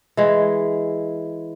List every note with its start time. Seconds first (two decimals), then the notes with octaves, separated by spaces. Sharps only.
0.17 E3 G#3